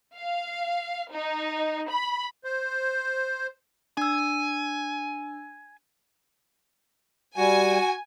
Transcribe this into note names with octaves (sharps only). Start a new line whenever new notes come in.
F5
D#4
B5
C5
D4 G#5 E6
G3 F#4 G#5